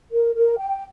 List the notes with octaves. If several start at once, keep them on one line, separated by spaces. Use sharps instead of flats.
A#4
A#4
G5